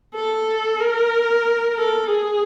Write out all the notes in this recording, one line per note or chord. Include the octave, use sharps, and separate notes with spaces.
A4
A#4
A4
G#4